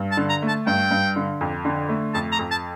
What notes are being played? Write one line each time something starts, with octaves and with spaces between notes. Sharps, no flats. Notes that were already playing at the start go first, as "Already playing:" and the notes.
Already playing: G2
A5
D3
A#5
A3
A5
G2 G5
G2
D3
F2
D3
A3
F2 A5
A#5
F2
A5